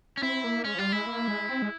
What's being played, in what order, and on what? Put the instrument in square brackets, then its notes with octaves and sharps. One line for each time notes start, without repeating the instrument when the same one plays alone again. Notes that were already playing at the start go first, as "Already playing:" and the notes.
[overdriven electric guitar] C#4
[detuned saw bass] C4 [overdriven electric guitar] E4
[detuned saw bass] A#3
[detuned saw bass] G#3 [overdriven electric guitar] C#4
[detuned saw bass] F3
[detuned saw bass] G3 [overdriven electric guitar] F4
[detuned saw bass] G#3 [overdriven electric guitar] E4
[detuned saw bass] A#3
G#3
C4
G#3